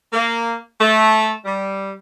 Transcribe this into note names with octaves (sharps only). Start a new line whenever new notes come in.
A#3
A3
G3